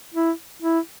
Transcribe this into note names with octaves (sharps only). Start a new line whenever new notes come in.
E4
E4